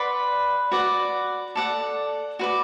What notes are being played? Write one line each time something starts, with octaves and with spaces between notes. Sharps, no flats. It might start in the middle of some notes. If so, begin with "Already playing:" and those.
Already playing: B4 D5 F#5 C6
F#4 B4 D5 F#5
A4 D5 F#5
F#4 B4 D5